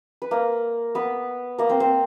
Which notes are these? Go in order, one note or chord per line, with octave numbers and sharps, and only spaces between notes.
B4
A#3 A#4
B3 B4
A#3 A#4
C4 C5
C4 C5